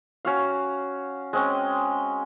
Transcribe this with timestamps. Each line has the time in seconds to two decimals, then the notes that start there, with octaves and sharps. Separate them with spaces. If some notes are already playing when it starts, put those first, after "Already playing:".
0.25 C#4 F#4 F5
1.33 G#3 C4 C#4